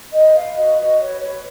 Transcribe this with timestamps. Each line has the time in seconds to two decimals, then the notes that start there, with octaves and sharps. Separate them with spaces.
0.12 B4 D#5
0.34 B4 F5
0.56 F#4 D#5
0.77 F#4 D#5
0.99 B4 C#5
1.20 B4 C#5